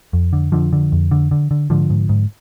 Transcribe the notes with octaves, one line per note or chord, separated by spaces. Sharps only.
F2
D3
F2 D3 F3
D3
F2
D3
D3
D3
G#2 D3 F3
G#2
G#2